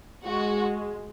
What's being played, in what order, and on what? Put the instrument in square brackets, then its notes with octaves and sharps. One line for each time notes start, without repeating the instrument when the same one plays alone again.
[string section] G#3 F#4